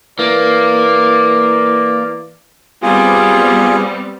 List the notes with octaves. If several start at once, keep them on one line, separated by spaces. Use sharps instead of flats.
E3 A#3 D5
G3 B3 C4 F4 G#4